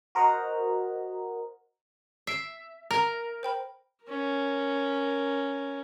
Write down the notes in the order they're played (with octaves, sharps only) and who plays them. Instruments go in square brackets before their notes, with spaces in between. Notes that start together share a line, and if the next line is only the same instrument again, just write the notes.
[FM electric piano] F#4 A#4 C5 D#5 F#5 A#5
[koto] E5 [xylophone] C7 D7
[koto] A#4 [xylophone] A#5
[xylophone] C5 G5 B5
[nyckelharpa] C#4 A#4